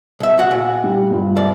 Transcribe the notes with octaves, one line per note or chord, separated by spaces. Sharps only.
B1 E5
B1 F#4 F#5
A#2
G3
G2 F4
C2 D5